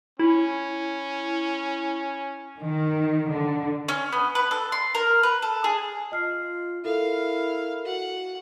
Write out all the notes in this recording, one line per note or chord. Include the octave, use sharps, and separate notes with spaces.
C#4 E4
D#3
D3
C#4
B3
B4
A4
C6
A#4
B4
A4
G#4
F4 D#5 F6 C7
E4 A4 A#4 F5
F#4 F#5